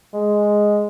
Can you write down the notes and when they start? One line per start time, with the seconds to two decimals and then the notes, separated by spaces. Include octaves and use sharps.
0.14 G#3